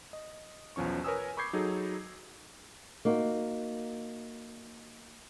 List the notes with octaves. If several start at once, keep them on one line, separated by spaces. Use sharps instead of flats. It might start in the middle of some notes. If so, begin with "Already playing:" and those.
D#5
B1 E2 F3 C#4 C#6
A#4 B4 C#5 G#5 D#6 E6
B5 C#6 D6 G6 G#6 C7
F#3 D#4 G#4 A4
A#3 D#4 F#4